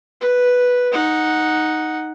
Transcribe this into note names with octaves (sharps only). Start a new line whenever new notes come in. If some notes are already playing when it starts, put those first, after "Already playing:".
B4
D#4 F#5